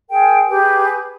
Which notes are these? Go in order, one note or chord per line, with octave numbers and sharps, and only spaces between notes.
G#4 A#4 G5
G4 G#4 B4